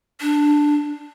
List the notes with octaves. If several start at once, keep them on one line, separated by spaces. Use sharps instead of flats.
D4